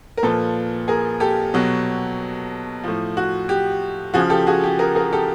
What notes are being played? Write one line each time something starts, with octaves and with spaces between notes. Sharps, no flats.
A#4
A#2 F3 A4 B4
G#4 A#4
G4 A4
B2 F#3
A2 F3
F#4
G4
C#3 F3 F#4 G#4
G4 A4
F#4 G#4
G4
G#4 A#4
G#4 A#4
G4 A4